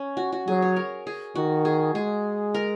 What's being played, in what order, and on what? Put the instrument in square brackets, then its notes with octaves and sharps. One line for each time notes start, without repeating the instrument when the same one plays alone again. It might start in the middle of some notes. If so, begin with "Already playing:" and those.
Already playing: [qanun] C#4
F#4
F#4
[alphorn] F#3 [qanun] G#4
[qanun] C#5
A#4
G#4
[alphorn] D#3 [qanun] F#4
[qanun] G#4
[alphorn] G#3 [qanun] G#4
[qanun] A#4